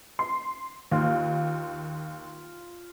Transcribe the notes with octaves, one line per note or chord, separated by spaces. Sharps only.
C6
D#2 F4